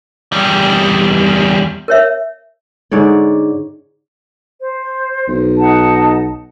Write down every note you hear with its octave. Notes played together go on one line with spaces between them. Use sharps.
E2 G3
A#4 C#5 E5
G#2 D3 C#5 D5
C5
B1
D#4 F#5 A5